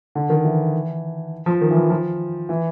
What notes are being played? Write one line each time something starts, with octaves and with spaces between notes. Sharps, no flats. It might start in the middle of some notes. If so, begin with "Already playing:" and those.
D3
D#3
E3
F3
D#3
E3
F3
F3
E3